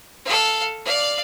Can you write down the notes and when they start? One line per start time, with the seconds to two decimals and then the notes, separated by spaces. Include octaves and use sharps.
0.25 A4 F5
0.85 D5 F5